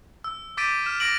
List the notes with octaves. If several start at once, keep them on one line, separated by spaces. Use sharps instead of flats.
E6
D6 G6 A6 B6 D7 D#7
F6 E7
D6 A#6 D7 F#7